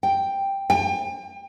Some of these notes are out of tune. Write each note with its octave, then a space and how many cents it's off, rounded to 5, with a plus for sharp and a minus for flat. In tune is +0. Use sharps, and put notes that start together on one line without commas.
G5 +5
G5 +35